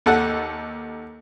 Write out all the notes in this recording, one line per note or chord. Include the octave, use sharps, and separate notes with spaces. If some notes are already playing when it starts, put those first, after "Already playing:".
D#2 A4 F#5